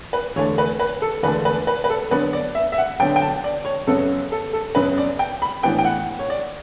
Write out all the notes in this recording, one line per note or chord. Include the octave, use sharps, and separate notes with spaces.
B4
E2 D3 A3 D4 C#5
B4
B4
A4
E2 D3 A3 D4 B4
B4
B4
B4
A4
D3 F#3 B3 D4 B4
D5
E5
E5
F#5
D3 F#3 B3 D4 G5
G5
A5
D5
C#5
F#2 C#3 F#3 B3 A4
A4
A4
F#2 C#3 F#3 B3 B4
D5
G5
B5
A2 E3 B3 D4 G5
G5
F#5
C#5
D5